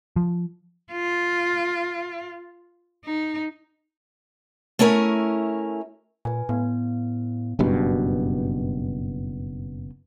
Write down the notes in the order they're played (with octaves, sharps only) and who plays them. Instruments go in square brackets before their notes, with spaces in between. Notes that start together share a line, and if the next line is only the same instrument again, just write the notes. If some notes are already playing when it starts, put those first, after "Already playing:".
[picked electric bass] F3
[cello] F4
D#4
[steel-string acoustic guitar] A3 C#4 E4 A#4 G#5
[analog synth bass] A#2 [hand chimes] B4 G#5
[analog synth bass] A2 [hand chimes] B3
[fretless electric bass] F#1 G2 B2